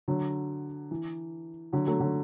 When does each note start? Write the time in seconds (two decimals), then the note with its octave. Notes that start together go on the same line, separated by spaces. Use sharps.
0.08 D3 F#3
0.91 E3
1.73 D3 F#3
1.87 F#3 A3
2.00 D3 F#3